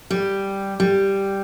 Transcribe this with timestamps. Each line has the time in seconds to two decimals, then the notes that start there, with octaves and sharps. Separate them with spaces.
0.10 G3
0.80 G3